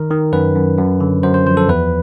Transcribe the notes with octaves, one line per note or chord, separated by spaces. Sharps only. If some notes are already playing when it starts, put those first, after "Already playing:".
Already playing: D#3 A#4
D#3
F#2 B4
F#2
F#2
D3
F#2 C5
C5
F3 C5
A4
E2 B4